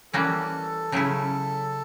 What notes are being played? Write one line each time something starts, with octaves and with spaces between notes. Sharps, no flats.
E3 G3 A#3 C#4 F#4 A4
C#3 F#3 A3 C#4 E4